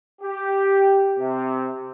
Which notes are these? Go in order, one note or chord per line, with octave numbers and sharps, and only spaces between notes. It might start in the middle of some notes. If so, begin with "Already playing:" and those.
G4
C3